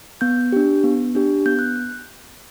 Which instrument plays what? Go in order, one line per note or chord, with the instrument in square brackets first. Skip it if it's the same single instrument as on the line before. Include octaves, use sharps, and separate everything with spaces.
[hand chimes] B3 G6
D4 G4
B3
D4 G4
B3 G6
F#6